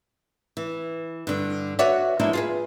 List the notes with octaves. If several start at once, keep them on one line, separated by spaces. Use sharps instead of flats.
E3
G2 D3
F#4 B4 C#5 D5 E5 F#5
F3 G#3 A#3 D4 E4
F4 G#4 B4